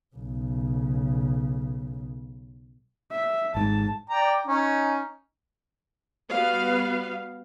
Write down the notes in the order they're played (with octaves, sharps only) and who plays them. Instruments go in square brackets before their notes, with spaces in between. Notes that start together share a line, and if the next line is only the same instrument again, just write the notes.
[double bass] B1 C#3
[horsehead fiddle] E5
[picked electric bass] G#1 G#2 [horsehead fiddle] A5
[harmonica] D5 G5 A#5
C#4 D#4
[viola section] G3 B3 F#4 B4 F5